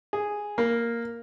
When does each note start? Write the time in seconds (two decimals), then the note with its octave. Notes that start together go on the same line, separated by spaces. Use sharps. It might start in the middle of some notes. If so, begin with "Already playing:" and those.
0.13 G#4
0.58 A#3